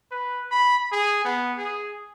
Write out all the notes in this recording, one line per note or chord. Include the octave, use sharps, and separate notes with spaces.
B4
B5
G#4
B3
G#4